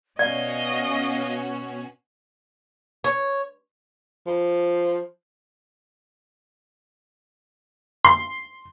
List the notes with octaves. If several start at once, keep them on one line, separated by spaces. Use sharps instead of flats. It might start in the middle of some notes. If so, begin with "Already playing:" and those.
B2 C#4 F#4 D5 D#5 F5
C#5
F3
C6